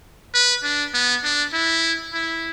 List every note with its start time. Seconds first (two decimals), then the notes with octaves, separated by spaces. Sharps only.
0.34 B4
0.63 D4
0.94 B3
1.24 D4
1.53 E4
2.14 E4